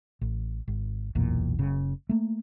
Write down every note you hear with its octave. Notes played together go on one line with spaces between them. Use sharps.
A1
G#1
F#1 B1 E2 A#2
F#1 C#3
A3 A#3